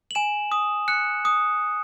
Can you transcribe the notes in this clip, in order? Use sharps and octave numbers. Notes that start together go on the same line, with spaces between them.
F#7
G#5 E7
D#6
F#6 C#7
D#6